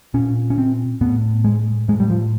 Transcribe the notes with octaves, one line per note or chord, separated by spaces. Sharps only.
A#2 C#4
C#4
C4
A2 B3
G#3
A2 G#3
G3
F3